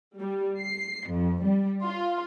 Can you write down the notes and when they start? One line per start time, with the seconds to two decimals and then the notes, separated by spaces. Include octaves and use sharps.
0.18 G3
0.61 C7
1.11 F2
1.45 G3
1.84 F4